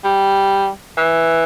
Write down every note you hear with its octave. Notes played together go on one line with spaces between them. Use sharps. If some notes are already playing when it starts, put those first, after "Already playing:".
G3
E3